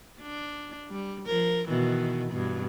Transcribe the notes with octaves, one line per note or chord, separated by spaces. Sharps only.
D4
G3
F3 A#4
B2 D#3 E3
G2 B2